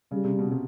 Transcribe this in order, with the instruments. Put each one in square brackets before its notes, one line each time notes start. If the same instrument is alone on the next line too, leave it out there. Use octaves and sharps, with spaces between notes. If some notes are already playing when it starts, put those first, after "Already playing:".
[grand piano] C#3 [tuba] G3
[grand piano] C3
B2
C3